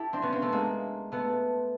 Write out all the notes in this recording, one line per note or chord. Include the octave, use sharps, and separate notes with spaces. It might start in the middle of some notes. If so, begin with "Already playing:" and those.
Already playing: E4 G4 A4
C4 D4
B3 C#4
A#3 C4
A3 B3
G#3 A#3
A3 B3